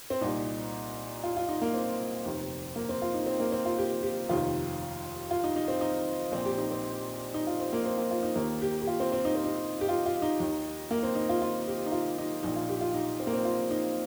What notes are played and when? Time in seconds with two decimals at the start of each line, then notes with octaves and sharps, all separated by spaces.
0.10 C4
0.21 C2 A#2 D#4
1.24 F4
1.37 F4
1.49 D#4
1.62 A#3
1.74 C4
2.26 F1 D#2 D#3
2.76 A#3
2.89 C4
3.02 F4
3.14 D#4
3.26 C4
3.40 A#3
3.52 C4
3.66 F4
3.78 G4
4.03 G4
4.29 F1 D#2 D#3 F4
5.31 F4
5.44 D#4
5.56 D#4
5.68 C4
5.81 D#4
6.32 A#1 A#2 C4
6.45 G4
6.58 D#4
6.71 C4
7.34 D#4
7.47 F4
7.60 C4
7.73 A#3
7.86 C4
7.98 A#3
8.11 F4
8.23 D#4
8.35 D#2 D#3 A#3
8.62 G4
8.82 G4
8.87 F4
9.00 C4
9.12 C4
9.25 D#4
9.35 C4
9.45 D#4
9.81 G4
9.89 F4
10.06 F4
10.22 D#4
10.40 D#2 D#3
10.91 A#3
11.03 C4
11.15 D#4
11.29 F4
11.42 F4
11.67 G4
11.86 D#4
11.92 F4
12.18 D#4
12.43 A#1 A#2 D#4
12.56 F4
12.69 G4
12.81 F4
12.94 D#4
13.20 C4
13.27 A#3
13.34 C4
13.45 F4
13.71 D#4